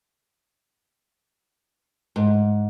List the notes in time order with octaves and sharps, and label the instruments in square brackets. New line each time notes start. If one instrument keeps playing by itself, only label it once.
[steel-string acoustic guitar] G#2